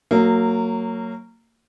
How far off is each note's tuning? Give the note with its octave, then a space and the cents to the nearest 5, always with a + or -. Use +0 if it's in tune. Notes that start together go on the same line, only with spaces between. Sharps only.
F#3 +0 A#3 -25